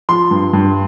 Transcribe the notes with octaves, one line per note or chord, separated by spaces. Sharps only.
F3 C6
G2
G2